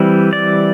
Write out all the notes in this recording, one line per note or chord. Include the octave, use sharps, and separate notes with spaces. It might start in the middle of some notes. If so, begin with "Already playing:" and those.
Already playing: E3 G3 C4
D5